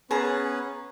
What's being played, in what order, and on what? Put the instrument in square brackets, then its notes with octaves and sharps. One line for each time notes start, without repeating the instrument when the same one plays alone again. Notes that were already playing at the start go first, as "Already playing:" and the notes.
[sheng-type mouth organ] B3 C#4 B4 [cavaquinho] G#4 A5 A#5